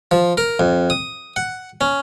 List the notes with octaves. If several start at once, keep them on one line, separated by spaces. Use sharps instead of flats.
F3
A#4
F2
D#6
F#5
C#4